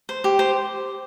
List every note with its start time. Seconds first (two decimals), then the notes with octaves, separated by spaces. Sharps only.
0.09 C5
0.24 G4
0.39 C5